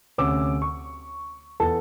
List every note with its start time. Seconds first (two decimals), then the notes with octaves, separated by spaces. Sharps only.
0.18 D2 C3 C#4 D6 E6
0.62 C#6
1.60 E2 A4 A5